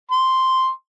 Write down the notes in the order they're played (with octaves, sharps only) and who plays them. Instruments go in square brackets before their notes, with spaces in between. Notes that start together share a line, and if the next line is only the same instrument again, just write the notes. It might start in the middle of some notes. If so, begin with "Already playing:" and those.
[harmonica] C6